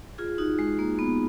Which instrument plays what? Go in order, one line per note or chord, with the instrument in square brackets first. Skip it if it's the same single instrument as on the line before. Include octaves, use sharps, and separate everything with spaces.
[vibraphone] F4 G#4
D#4 F#4
G#3
A#3
B3